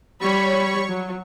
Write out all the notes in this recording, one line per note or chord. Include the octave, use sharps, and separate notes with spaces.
G3 C#5 B5 C#6
F#3